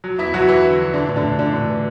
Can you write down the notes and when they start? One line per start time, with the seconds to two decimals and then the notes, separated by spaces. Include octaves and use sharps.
0.04 F#3
0.19 E2 E4 E5
0.34 E2 F#3 F#4
0.48 E2 E3 E4
0.64 D3
0.79 F#3
0.94 D3 E3 D4
1.09 A2
1.16 D3 D4
1.24 A2
1.39 D3 E3 D4
1.53 A2
1.69 E3